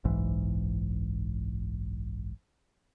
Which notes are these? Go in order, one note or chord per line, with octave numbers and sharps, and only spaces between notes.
F#1 B1 G#2 E3